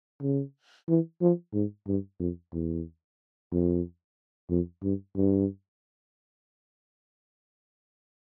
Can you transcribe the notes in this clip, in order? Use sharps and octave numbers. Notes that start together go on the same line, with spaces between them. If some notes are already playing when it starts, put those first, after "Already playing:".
C#3
E3
F3
G#2
G2
F2
E2
F2
F2
G2
G2